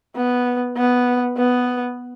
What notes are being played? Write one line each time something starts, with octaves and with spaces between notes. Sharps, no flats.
B3
B3
B3